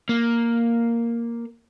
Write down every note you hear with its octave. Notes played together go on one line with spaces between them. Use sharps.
A#3